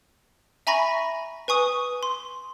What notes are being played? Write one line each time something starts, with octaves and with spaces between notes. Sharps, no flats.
E5 G#5 A#5 B5 C#6 A#6
B4 G#5 C#6 D#6
C6